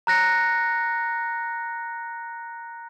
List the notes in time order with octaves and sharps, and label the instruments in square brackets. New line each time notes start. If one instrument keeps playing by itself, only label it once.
[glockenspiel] A#5 F#6 A#6 C#7